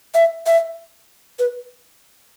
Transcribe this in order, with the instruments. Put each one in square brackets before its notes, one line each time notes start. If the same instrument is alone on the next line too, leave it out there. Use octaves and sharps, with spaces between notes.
[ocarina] E5
E5
B4